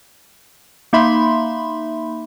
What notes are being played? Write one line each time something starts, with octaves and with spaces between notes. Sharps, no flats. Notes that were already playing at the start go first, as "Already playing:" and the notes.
A#3 D#4 E5 B5 C6